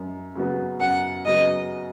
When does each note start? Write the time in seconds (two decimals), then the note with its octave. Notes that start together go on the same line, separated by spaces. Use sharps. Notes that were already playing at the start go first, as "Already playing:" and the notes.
Already playing: F#2
0.35 C#3 F#3 B3
0.80 F#2 F#5
1.25 C#3 F#3 B3 D#5